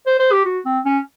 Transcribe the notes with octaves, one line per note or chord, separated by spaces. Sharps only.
C5
C5
G4
F#4
C4
C#4